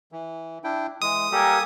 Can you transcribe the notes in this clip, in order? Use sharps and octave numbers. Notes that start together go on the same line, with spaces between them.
E3
D4 E4 G5
E3 G#3 D#6
G3 A#3 G4 A4 A#4 G#5